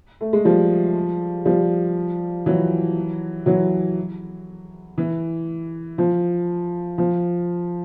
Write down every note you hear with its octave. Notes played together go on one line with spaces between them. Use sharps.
A3
G#3
F3 G3
F3 G3
E3 F#3
E3 F#3
E3
F3
F3